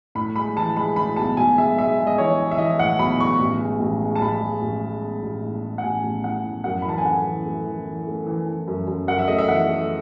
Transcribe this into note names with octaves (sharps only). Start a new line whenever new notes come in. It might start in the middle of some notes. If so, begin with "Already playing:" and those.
A2 B5
G#3 B5
E3 A5
G#3 B5
A2 B5
B1 A5
B1 G#5
G#3 E5
G#3 E5
G#3
D#5
E3 C#5
E3
E5
E3 D#5
A2 F#5
B1 B5
E3 C#6
A1
G#3
A1
G#3
A5
A1 B5
G#3
A1
G#3
G#3
A1
A2
G#3
F#5
A1 G#5
A1
A2 F#5
A2
F#2 F#5
B5
E3 A5
G#5
A3 F#5
E3
A3
E3
E3
A3
E3
E3
F#2
F#2
F#2 F#5
E5
A3 D#5
E5
E3 F#5
A3